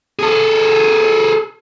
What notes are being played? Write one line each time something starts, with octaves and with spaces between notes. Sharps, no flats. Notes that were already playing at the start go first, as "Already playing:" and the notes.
G#4 A4